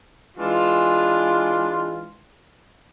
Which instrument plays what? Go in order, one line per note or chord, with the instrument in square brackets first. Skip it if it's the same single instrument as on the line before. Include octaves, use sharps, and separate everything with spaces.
[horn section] E3 G#3 D4 F4